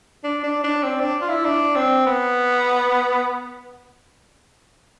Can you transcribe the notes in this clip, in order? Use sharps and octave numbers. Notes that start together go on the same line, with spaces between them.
D4
D4
D4
C4
D4
F4
E4
D4
C4
B3